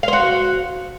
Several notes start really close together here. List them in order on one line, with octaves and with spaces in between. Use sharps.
F5 C5 F#4